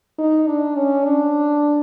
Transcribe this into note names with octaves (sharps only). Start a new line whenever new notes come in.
D#4
D4
C#4
D4